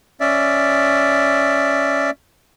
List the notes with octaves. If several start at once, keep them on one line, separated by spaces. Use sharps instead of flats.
C#4 D5 E5